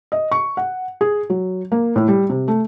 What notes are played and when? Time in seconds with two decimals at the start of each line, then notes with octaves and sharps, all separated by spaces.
0.12 D#5
0.31 C#6
0.57 F#5
1.01 G#4
1.30 F#3
1.72 A#3
1.96 A2
2.08 G3
2.30 C3
2.48 A3